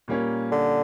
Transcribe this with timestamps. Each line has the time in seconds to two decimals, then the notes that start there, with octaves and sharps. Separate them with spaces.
0.08 A#2 G3 A#3 C#4
0.51 D3